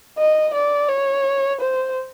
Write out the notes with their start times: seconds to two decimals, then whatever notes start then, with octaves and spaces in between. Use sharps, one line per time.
0.18 D#5
0.54 D5
0.89 C#5
1.60 C5